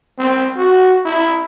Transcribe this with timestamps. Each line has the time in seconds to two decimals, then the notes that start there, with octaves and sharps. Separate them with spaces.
0.18 C4
0.56 F#4
1.05 E4